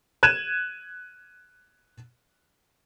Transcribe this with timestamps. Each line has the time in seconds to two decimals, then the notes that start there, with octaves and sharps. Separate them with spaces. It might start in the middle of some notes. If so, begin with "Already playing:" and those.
0.23 F#6 G#6 D#7 E7